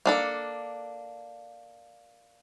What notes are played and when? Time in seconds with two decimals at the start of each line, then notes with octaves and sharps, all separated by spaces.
0.06 A#3 D4 A4